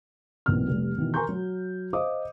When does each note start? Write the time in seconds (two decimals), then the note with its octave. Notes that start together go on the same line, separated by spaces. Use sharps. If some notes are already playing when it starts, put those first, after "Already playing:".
0.46 B1 A#2 E3 B3 C4 F6
0.68 F1 G3
0.98 B2 D#3 E3
1.14 A#4 G#5 A#5 C6 C#6 G6
1.29 F#3
1.93 C5 D#5 F5 D6 D#6